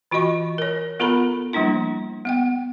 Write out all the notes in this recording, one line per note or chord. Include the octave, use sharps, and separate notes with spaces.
E3 F4 F#4 D#5 C#6
A#4 C#5
B3 F4 A4 A#4 A#5 B5
F3 G3 A#3 D4 E4
B3 F#5 G5